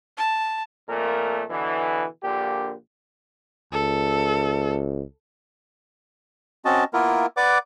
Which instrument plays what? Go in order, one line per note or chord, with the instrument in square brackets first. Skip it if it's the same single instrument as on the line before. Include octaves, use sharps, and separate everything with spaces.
[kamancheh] A5
[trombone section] F2 A#2 A3 A#4
B2 D3 E3
A#1 A#2 D3 G4
[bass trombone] C#2 [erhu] A4
[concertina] C4 C#4 F#4 D#5 A5
A#3 B3 E4 F4 A#4
B4 D5 F#5 D6